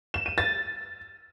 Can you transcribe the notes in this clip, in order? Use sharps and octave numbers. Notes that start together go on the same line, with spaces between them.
E7
D#7
A6